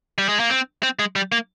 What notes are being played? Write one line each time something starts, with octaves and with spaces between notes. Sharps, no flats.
G3
G#3
A#3
C4
C4
G#3
G3
A#3